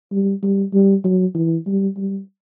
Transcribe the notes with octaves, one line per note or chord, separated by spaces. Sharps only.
G3
G3
G3
F#3
E3
G3
G3